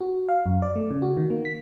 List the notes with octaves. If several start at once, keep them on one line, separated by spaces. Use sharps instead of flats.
F#4
F5
F#2
D5
A3
C#3
F#4
D#3
A#3
B6